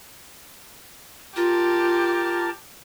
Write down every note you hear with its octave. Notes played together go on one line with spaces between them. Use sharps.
F4 G4 A#4 A5